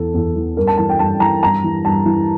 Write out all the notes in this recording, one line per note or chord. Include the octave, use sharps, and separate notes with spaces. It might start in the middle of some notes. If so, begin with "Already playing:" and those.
Already playing: E2 E3 A4
E2
E3
G2 A#4
A5
E3 A5
G5
G2 A5
E3 A#5
G2 A#5
E3
G2 A5
E3